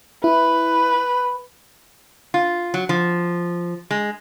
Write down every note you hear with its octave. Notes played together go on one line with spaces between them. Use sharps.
E4 B4
F4
F#3
F3
G#3